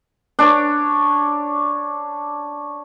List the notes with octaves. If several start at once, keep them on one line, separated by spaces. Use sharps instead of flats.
D4 C#5